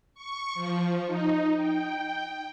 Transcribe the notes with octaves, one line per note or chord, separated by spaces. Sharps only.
C#6
F3
D#4
G5